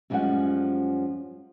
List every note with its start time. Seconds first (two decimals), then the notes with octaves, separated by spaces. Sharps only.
0.10 F#2 F3 G3 G#3 C#4 F#5